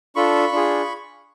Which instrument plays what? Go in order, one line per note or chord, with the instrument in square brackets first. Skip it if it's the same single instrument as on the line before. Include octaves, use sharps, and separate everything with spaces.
[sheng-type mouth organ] D4 F4 A4 B5 C#6
D4 F4 G#4